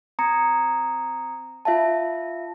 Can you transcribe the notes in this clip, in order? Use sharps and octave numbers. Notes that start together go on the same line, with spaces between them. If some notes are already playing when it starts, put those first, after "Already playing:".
C4 A#5 D#6 G#6 C#7
F4 E5 F5 A5